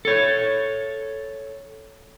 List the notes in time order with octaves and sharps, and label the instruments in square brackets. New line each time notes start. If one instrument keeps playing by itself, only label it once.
[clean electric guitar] A4 C#5